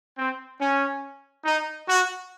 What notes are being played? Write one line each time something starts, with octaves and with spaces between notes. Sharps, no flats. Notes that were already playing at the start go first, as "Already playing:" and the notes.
C4
C#4
D#4
F#4